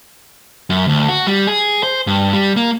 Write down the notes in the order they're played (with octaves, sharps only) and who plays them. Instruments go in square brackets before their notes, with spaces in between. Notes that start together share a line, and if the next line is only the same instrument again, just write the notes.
[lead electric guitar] F#2
D2
F#4
G3
G#4
C5
G2
G3
A#3